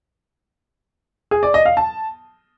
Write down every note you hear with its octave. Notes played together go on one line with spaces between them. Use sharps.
G#4
D5
D#5
F5
A5